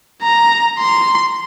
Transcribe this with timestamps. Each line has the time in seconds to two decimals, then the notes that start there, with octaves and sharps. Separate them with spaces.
0.23 A#5
0.78 C6